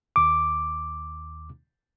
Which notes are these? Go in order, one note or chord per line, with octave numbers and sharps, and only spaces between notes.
D#2 D6